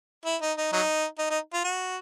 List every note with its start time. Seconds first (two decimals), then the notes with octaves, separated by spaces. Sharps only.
0.25 E4
0.41 D#4
0.57 D#4
0.73 F#3 D#4
1.18 D#4
1.30 D#4
1.53 F4
1.64 F#4